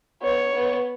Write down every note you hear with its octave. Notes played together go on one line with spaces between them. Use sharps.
B3 C#5
B3